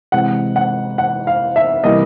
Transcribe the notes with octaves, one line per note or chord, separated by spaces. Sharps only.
C3 E3 G#3 F#5
F#5
F#5
F5
E5
C3 E3 G3 A#3 D#5